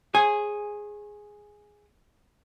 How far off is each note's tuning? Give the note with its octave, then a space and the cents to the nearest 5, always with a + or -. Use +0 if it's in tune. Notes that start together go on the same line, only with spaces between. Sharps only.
G#4 +0 C#5 -45 G#5 -5